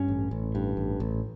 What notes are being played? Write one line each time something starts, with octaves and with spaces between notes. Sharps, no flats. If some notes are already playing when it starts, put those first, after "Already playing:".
Already playing: G2 C#4
A1
A1
G2
A1
A1